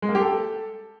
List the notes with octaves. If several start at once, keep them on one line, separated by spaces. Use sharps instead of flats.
G#3
A#3
G4
A4